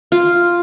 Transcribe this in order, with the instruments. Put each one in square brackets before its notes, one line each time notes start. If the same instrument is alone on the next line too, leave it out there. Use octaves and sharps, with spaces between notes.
[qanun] F4